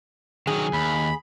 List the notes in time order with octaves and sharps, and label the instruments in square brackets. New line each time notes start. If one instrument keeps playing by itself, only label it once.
[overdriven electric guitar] D#3 F#3 [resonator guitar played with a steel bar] G#4
[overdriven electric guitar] D#2 [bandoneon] B5